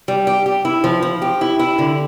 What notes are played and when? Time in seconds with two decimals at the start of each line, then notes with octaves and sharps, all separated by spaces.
0.08 G3
0.27 G4
0.46 G4
0.65 E4
0.84 F3
1.02 F3
1.22 G4
1.41 E4
1.59 E4
1.78 D3